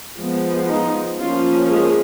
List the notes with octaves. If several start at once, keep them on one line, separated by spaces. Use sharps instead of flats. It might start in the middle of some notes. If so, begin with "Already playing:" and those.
F3 G#3 B3
D#4
F3 A#3 C#4 F4
G#3 G#4